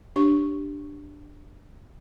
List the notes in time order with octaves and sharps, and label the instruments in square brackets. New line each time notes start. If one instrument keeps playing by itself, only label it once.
[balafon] D4 G4 C#5 C#6